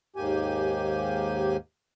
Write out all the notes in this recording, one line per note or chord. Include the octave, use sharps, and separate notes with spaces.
D#2 G#2 A#3 G4 G#5